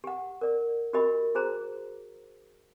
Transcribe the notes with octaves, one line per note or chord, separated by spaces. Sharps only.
G4 F#5
A#4 D5
F#4 G4 A#4 D#5 B5
F#4 G#4 C5 A#5